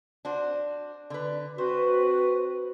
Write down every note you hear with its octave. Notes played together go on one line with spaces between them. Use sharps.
D4 F#4 C5
D3 B4
C4 F#4 B4 C5